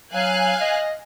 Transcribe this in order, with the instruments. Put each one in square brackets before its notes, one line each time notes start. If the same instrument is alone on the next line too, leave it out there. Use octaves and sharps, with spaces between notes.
[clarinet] F#3 [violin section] F5 G#5 F#6
[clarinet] D#5